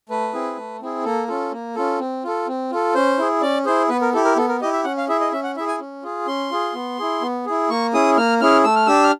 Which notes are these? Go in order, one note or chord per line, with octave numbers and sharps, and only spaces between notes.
A3 B4
C4 E4 G#4
A3
C4 E4 G#4
A#3 A4
C#4 F4 A4
A#3
C#4 F4 A4
C4
F4 A4
C4
F4 A4
C#4 C5
E4 G#4
C#4 D5
E4 G#4 C5
B3 B4
A#4
E4 G4 A4
A#4
B3 A4
A#4
E4 G4 D#5
E5
C#4 F#5
F5
E4 G#4 E5
D#5
C#4 E5
F#5
E4 G#4 E5
G#5
C#4
F4 G#4
C#4 C6
F4 G#4
B3
E4 G#4
B3
E4 G#4
A#3 C#6
C#4 E4 G#4 D#6
A#3 F6
C#4 E4 G#4 F6
A3 E6
F6
D4 G4 E6
F6